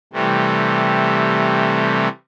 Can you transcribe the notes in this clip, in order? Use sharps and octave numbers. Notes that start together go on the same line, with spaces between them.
C3 E3 G3 A3